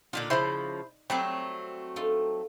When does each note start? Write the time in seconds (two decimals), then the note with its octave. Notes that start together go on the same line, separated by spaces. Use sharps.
0.13 A#2 D3 D#4 F4 D5
0.30 C#3 F3 E4 C5
1.10 F#3 G3 A3 C4 C5
1.96 D#4 F4 A4